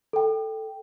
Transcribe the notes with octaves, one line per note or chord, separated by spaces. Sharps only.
A4 G5